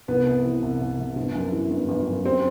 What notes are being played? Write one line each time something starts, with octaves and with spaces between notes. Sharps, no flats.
C2 B3
C3
E3
C2
C2
C3
G1
F#2
E3
G1
G1
F#2
C4